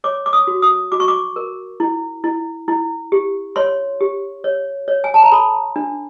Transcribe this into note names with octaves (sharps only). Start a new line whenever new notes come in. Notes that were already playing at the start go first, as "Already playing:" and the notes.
C#5 D6
D6
D#6
F#4
D#6
F#4 D6
C#6
D6
A#4
E4
E4
E4
G4
C#5 C6
G4
C#5
C#5
G#5
A5
A#5
A4 B5
D4